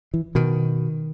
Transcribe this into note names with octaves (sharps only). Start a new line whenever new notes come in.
E3
B2 D#3